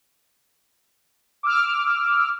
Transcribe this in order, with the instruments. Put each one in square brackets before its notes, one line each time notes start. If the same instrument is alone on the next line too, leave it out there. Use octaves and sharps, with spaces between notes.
[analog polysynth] D6 E6 F6